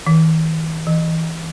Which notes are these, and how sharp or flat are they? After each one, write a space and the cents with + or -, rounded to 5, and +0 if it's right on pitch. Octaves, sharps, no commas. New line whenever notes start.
E3 -45
E3 -15